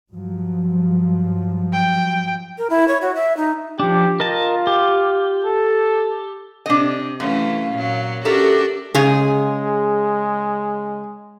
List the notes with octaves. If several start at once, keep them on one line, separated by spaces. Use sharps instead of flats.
G2 F3 F#3
G5
A#4
E4
C#5
F#4
E5
D#4
F3 D4 G4
F4 A#4 D#5 A5
G4
A4
C3 D4 D#5
F#2 E3 A3 C#4 F5
A#2 F#3
C#4 D4 F#4 G4 A4 A#4 E5
C#3 G#3 G#4